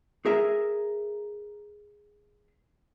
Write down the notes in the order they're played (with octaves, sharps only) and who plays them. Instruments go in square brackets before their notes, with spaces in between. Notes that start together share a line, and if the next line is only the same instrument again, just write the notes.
[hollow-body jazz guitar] G#4 A#4 E5